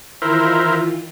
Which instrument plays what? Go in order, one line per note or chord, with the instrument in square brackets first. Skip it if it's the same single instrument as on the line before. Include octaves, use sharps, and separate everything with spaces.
[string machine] D#3 E3 F4 [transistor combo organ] E4 A#4 C5